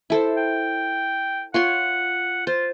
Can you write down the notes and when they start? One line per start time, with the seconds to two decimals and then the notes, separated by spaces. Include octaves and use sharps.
0.10 E4 A4 C5
0.37 G5
1.54 F4 C#5 F#5 C6
2.47 F4 C5